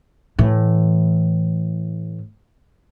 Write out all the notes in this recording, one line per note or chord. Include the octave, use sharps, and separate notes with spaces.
A2 E3